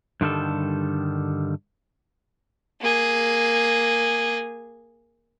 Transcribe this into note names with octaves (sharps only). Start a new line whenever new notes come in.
G2 D3 D#3 G3 A4
A#3 G#4